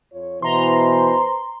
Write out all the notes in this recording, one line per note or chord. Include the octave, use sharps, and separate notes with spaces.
F2 F4 C#5
B2 E3 B4 C5 A#5 C6